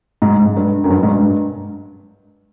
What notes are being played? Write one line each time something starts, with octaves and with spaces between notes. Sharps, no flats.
G#2
G#2
G2
F#2
G2
G#2
G2